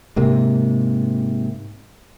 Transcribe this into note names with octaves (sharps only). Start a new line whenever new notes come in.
G#2 C3 A#3